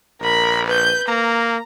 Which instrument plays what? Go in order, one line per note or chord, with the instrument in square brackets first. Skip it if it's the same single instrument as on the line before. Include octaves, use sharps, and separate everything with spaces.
[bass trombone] A#1 [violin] A#4 B5
[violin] B4 G6
[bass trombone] A#3 [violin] A#5